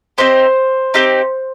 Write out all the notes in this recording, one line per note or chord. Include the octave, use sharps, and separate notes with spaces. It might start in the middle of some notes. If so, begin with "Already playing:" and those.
C4 D#4 G4 C5
C4 D#4 G4